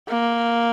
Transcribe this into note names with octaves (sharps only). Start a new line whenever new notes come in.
A#3